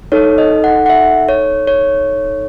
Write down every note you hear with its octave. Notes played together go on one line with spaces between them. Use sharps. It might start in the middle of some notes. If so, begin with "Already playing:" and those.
D#4 A4 C#5
D#5
F#5
F#5
E5
C#5
C#5